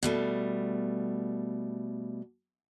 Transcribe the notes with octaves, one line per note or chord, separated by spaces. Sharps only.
B2 G3 A3